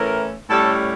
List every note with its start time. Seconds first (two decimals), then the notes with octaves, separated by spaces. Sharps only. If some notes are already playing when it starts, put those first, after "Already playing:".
Already playing: A2 E3 A3 C#4 A#4
0.48 A2 G3 C#4 A4